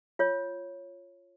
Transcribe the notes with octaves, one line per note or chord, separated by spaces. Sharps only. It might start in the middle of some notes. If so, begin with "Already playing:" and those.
F4 C#5